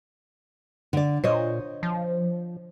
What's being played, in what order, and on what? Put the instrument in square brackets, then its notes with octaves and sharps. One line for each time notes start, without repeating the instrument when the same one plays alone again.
[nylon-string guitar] D3 D5
[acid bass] A#2 [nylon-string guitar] C5 C#5 D#5
[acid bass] F3